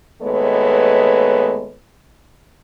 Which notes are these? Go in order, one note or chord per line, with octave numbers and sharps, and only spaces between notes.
D#2 G#3 A3 B3 B4 C#5